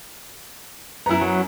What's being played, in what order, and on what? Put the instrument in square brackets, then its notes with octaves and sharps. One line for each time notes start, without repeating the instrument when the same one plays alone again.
[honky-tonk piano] F#2 A#5 [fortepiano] B3 E4
[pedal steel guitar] F#3